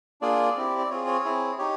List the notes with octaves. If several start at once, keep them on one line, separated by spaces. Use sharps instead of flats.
A#3 D4 F4 G#4 D5
C4 E4 G4
D5
C4 F4 G#4 C#5
C#5
C4 E4 G#4
D#4 G4 C#5